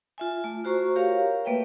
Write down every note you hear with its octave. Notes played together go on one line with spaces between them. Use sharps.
F4 E5 G#5
A3
F4 F#4 C5 A#5 C#6
G4 A#4 C#5 F5 A#5
A3 A#3 B4 E5 G5